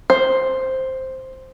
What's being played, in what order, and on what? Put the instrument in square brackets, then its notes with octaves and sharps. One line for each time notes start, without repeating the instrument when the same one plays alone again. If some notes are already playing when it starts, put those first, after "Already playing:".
[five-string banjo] C5